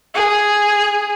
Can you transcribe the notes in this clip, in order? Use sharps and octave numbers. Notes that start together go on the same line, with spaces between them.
G#4